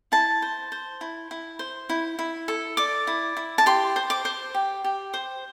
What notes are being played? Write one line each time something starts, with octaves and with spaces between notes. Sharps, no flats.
E4 A5
C5
C5
E4
E4
C5
E4
E4
A4
D5 D6
E4
E4
A5
G4 C6
C5
D6
C5
G4
G4
C5